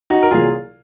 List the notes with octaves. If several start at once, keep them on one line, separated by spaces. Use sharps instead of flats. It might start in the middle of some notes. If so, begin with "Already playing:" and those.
D#4 F#4
A#4
C2 A#2 F#3 F4 G#4